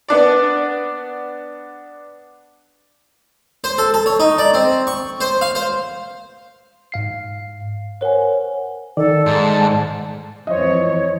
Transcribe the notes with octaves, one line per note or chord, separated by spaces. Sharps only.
B3 D4 D5
C5
A4
A4
C#5
D#4
D5
C4
C#6
C5
F5
C5
G#2 F5 C7
A#4 C5 C#5 F#5 G#5
D#3 A4 D5
G#2 A5
F2 E3 C5 C#5 D#5